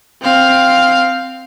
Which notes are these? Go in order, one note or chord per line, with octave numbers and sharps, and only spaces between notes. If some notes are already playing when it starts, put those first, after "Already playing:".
C4 F5